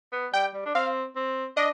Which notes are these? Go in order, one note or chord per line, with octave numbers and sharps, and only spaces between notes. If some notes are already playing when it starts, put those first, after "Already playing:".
B3
G3 G5
G3
D4
C4 F5
C4
D4 D#5